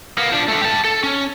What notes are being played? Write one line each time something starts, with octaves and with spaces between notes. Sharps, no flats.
A#3 B3
F3 D4
D3 A3
G4 A5
A4
C#4